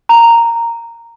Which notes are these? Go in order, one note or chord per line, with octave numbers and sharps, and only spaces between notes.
A#5